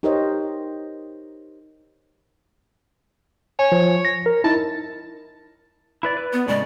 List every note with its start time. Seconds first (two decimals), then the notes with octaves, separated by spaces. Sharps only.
0.03 D#4 G4 A#4 C5 C#5 D#5
3.59 C#5 G#5
3.72 F3
4.05 A#6
4.26 A#4
4.44 D#4 E4 A5
6.03 E4 B4 D5
6.17 B4
6.33 B3
6.48 A2 C#3 G#3 D5